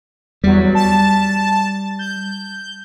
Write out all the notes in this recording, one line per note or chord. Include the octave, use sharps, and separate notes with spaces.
E2 F#3 G3
A5
G6